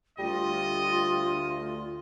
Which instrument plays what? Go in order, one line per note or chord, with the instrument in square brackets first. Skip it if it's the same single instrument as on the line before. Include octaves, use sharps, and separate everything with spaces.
[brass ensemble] D2 [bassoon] G3 [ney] F4 [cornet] D#5